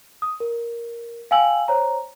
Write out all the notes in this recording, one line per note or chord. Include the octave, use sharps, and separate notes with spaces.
D#6
A#4
F5 G5 G#5 E6 F#7
C5 C#5 A#5